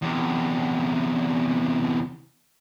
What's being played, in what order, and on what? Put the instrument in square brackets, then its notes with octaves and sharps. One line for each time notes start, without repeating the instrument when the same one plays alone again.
[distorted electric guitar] E2 C3